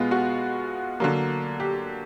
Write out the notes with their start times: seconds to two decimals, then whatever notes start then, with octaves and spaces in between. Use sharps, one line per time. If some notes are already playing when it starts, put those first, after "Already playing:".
Already playing: B2 G#3 B3 F4
0.11 F#4
1.00 D3 F#3 A#3
1.60 G4